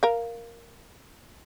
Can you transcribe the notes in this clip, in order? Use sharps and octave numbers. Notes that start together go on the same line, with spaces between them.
A#4 F5